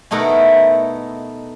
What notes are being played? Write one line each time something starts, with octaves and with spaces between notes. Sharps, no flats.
B2 A3 D#4 E4 A#4 F#5